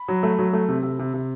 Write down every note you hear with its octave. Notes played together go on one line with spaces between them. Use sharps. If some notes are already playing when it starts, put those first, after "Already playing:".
Already playing: B5
F#3
A3
F#3
A3
C3
C3
C3
C3